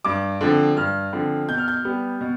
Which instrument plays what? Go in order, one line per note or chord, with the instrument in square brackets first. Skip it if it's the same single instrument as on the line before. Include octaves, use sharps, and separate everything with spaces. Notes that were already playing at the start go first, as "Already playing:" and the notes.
[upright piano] G2 D6
D3 F3 C4
G2 F6
D3 F3 C4
B2 G6
F6
G6
G3 B3
B2